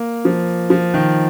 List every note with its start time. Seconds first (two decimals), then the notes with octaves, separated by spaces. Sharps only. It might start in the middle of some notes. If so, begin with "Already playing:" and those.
Already playing: A#3
0.25 F3
0.70 F3
0.94 D#3